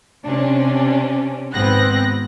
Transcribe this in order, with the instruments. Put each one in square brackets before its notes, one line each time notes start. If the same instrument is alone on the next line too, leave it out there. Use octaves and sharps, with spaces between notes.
[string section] C3 C#4 D4
G#1 G#2 B3 C4 F#6 A#6